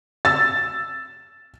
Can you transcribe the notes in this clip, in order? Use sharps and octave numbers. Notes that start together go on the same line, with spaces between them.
E6 A6